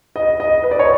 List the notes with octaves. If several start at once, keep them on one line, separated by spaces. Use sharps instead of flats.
D#5
D#5
B4
D5
C#5